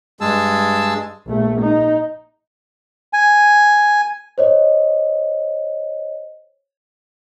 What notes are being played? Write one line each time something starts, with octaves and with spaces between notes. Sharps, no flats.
G2 G#3 G#4 A5 E6
A#1 A3
D#4
G#5
C5 C#5 D#5